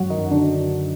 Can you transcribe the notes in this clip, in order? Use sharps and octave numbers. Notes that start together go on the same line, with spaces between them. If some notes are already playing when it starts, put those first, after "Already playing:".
Already playing: F#2 F#3 F#4
D#3 D#4
F#2
D3 D4